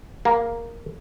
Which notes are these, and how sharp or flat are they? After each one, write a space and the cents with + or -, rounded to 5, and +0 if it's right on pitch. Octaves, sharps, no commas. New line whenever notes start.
A#3 +0 G#4 +0